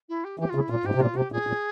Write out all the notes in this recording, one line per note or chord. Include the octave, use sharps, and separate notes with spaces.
E4
G4
E3 G4
F4
C#3
E4
A#2 F4
G#2 G4
C3
A#2 F4
C3 G4
A#2 G#4
A#2